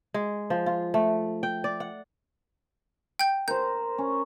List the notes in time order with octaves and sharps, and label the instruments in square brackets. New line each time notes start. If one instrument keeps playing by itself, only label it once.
[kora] G#3
F3
F4
A3
G5
D5
F#5
[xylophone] G5 G6
[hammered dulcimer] A#4 C5 [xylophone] G6
[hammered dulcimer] C#4